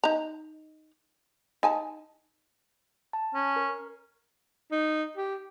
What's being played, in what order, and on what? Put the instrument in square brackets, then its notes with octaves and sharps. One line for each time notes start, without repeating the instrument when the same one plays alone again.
[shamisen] D#4 A#5
D#4 G#5 A5
[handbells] A5
[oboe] C#4
[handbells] A#4
[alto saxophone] D#4
G4